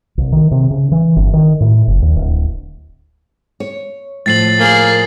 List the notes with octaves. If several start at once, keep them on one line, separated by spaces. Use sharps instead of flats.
C2
D#3
C3
C#3
E3
G1
D#3
A2
F#1
D#2
D1
C#5
A2 F3 A6 C7 F#7
A#3 G#4